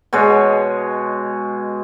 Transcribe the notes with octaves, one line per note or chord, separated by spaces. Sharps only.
B2 G#3 C#5